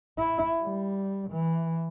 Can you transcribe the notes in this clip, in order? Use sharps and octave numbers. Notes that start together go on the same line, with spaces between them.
E4
G3
E3